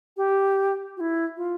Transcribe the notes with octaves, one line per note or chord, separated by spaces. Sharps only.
G4
F#4
E4
F4